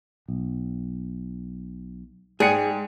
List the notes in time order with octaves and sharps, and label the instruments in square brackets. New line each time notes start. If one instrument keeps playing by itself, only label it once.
[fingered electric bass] B1
[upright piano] G#2 C#7 [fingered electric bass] G#3 [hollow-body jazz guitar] G#4 [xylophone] D5 G5 F#6